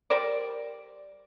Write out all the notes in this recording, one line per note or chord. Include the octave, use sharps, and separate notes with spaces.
G3 A#4 C5 D5